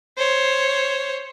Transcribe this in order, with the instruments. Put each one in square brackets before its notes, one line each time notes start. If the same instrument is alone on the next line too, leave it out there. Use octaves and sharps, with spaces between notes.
[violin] C5 C#5